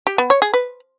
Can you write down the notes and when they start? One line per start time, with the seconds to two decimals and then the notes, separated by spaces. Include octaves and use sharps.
0.07 G4
0.18 B3
0.30 C#5
0.42 G#4
0.53 B4